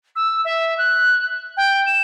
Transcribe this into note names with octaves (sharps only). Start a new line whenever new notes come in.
E6
E5
F#6
G5
E7